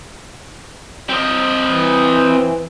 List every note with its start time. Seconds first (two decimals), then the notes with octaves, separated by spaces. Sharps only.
1.10 C4 D#5
1.65 E3